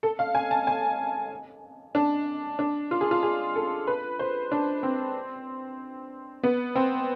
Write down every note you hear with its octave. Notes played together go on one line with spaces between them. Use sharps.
A4
F5
G#5
A5
G#5
D4
D4
F4
G#4
F4
G#4
A4
B4
C5
D4
C4
B3
C4